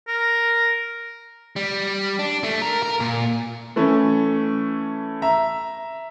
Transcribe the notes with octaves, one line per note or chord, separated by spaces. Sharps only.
A#4
G3
D4
A3
A#4
A#4
A#2
E3 A3 C#4
E5 A#5